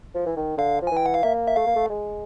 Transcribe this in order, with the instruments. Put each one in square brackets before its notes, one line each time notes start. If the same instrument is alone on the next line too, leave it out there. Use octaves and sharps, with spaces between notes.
[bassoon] F3
E3
D#3
[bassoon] D3 [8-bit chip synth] F5
[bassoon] F3
[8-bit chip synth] G#5
[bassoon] E3
[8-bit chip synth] G5
F#5
F5
[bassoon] A#3 [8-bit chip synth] E5
[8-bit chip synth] E5
[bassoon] A3 [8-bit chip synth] F5
[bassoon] A#3
A3
G#3